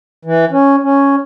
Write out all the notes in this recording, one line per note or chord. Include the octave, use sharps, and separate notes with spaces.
E3
C#4
C#4